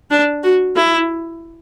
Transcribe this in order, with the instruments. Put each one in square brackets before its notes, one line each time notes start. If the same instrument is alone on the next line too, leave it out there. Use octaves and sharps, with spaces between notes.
[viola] D4
F#4
E4